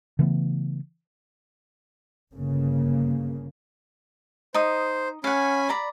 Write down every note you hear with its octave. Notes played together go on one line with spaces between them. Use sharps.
C#3 E3 A3 B3
G1 C#3 A#3
D#4 C5 D#6
C#4 F5 F#5 G#5 B5
D5 A#5 B5